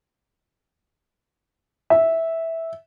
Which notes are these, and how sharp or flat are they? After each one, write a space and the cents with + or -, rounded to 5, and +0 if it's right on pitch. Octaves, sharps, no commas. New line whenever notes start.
E5 -10